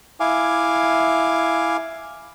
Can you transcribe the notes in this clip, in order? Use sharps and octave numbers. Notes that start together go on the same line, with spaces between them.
E4 F5 G#5 D6